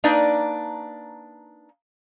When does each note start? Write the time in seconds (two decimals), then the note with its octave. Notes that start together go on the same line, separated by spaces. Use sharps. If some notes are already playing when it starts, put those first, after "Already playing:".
0.04 A#3 D4 D#4 B4 D5